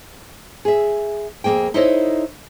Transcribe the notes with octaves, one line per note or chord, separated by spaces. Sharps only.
G#4 E5
F2 B2 A#3 G#4 G5
D#4 E4 A4 C5 C#5 D#5